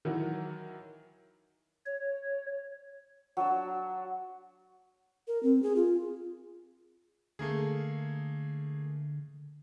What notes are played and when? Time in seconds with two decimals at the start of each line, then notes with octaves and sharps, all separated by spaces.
0.05 D#3 E3 F#3
1.86 C#5
3.37 F#3 D4 E6
5.28 A#4
5.43 C4
5.63 G#4
5.76 F4
7.39 D3 A3 A#3 G#4